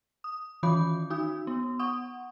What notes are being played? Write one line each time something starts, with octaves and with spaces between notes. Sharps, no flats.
D#6
D#3 E3 C#4 C#5 B5 G6
D#4 F#4 D#6
B3
F#5 C#6 D#6